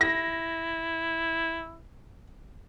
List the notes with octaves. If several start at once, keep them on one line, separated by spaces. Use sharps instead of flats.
E4 A#6